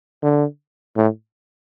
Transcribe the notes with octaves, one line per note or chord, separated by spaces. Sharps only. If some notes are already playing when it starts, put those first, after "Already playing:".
D3
A2